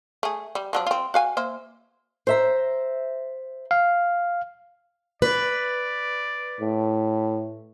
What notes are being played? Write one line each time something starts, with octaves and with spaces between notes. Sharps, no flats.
A3 G#4
G3
F3 F#3 D4
C4 F4
F#4 F5 G#5
A#3 C5 E5
C5 E5 A#5
F5
B4 D5
A2